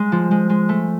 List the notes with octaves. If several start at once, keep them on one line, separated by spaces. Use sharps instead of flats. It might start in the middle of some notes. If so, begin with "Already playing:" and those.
Already playing: G#3
F3
G#3
G#3
A3